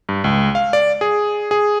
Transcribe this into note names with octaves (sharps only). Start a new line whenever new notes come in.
G2
C#2
F5
D5
G#4
G#4